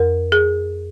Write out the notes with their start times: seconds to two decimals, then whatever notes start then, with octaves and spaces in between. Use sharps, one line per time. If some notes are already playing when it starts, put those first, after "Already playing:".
Already playing: F2 A#4
0.32 G#4